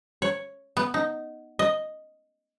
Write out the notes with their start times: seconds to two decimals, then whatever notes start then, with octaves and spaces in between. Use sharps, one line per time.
0.22 C#5
0.77 B3
0.94 D#4
1.59 D#5